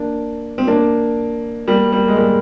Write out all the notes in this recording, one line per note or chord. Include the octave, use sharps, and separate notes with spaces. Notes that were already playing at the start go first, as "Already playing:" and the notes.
Already playing: A#3 D4
C4
A#3 D4
G3 A#3
G3 A#3
G#3
G3 A#3